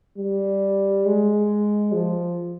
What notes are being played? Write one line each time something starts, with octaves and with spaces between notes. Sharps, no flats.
G3
G#3
F3